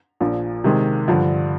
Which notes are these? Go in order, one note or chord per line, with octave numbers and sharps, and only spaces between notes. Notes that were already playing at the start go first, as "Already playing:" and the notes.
A#1 A#2 F3
C3 D#3 G#3
G2 D3 F3